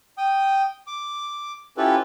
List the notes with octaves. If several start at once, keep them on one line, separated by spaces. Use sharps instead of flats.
G5 D#6
D6
C#4 E4 F4 G4 A4 B4